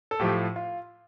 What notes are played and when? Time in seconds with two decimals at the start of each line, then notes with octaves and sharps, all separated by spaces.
0.11 A4
0.19 A2 F3 A3 G4
0.56 F4